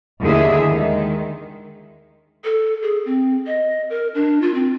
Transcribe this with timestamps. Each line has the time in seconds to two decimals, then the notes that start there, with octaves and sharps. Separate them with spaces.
0.21 D#2 D3 A#3 E4 G#4 E5
0.70 D#3 G#3
2.44 A4
2.83 G#4
3.05 C4
3.47 D#5
3.90 A#4
4.15 D4
4.42 F4
4.54 C4